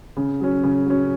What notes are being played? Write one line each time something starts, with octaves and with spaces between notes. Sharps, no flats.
C#3
F#3 C#4
C#3
F#3 C#4